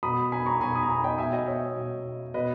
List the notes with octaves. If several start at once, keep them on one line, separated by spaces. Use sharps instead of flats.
B2 B5 D#6
G#5 B5
A#5 C#6
B2 G#5 B5
B5 D#6
A#5
G#5 B5
D#5 G5
B2 E5 G#5
D#5 G5
C#5 E5
B2
B2 B4 D#5